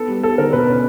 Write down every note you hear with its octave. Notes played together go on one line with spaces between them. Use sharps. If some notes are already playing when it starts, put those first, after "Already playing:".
Already playing: B3 A4
G3
G3 A4
D3 A#4
B2 B4
C#4